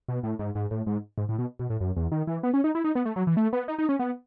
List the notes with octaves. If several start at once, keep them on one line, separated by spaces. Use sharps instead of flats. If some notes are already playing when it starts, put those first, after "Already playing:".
B2
A2
G#2
G#2
A2
G#2
G#2
A2
B2
B2
A2
F#2
E2
D#3
E3
B3
C#4
D#4
E4
D#4
B3
A3
F#3
E3
A3
B3
D#4
D#4
C#4
B3